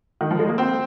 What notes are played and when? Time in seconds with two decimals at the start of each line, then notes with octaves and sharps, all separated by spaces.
0.21 D#3
0.31 F3
0.39 G#3
0.49 A#3
0.58 C4